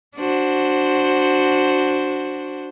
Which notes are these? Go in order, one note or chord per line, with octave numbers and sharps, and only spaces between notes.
D4 F#4 C5